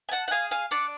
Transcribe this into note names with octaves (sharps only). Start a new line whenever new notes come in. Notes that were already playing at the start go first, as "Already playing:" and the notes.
G#5
F#5 A5
F#5
G#4 F5 G#5
F5 G#5
D4 D5 F#5